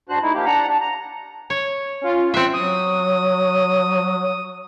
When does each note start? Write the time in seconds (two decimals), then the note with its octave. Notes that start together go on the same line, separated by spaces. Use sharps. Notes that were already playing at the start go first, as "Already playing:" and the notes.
0.09 G#2 D4 F#4 C5 F#6
0.22 A3 D#4 E4
0.34 F3 A#3 G4
0.46 D4 F#5 A#5
0.67 D4
0.81 A#5
1.50 C#5
2.01 C#4 F4
2.34 C4 E5 F#6 C7 C#7
2.53 F#3 D#6